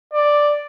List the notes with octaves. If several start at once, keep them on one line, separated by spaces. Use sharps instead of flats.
D5